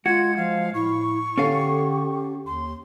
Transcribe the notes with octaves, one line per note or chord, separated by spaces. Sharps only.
G#3 F4 F#4 G#6
F3 F5
A2 E4 C#6
D3 C#4 G4 A4 F5
D#2 C6